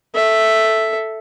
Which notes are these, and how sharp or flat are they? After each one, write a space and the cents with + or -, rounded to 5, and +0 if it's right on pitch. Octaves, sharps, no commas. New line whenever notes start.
A4 +0 E5 +0